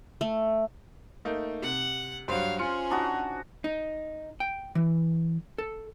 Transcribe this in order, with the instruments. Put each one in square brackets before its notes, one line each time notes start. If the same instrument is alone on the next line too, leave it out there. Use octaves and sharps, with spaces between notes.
[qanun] A3
[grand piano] A3 A#3 D#4
[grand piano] C3 [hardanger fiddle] F#5
[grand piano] G2 F#3 [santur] C5 [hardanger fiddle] C#5 F5
[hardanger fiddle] C#4 G#4 [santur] F4 [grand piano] C#7
[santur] D4 D#4 F#4
[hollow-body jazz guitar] D#4
G5
E3
A4